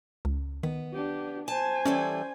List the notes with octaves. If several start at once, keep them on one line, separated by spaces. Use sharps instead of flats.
C#2
D#3 B3
D4 G4
C5 G#5 A5
E3 G3 C#4 A4